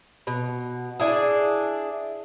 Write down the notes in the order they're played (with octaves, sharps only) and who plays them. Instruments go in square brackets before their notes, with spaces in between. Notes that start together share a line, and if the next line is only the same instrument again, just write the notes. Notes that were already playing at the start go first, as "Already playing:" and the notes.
[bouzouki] B2
D4 E4 G#4